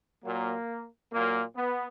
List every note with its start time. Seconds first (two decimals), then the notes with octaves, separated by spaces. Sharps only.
0.23 A#2 F#3 A#3
1.12 A#2 F#3 A#3
1.56 B3